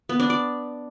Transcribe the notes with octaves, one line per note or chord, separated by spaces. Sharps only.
B3
D4
D5